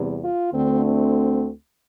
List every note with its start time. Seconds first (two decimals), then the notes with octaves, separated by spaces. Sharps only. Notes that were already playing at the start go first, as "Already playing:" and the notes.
Already playing: E2 C3 G3
0.22 F4
0.53 D2 D3 A3 C4
0.84 C4